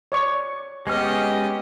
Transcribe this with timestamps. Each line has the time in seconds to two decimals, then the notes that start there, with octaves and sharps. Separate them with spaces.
0.12 C#5 D5 C#6
0.87 G#3 B3 C#4 G4 D#5 F6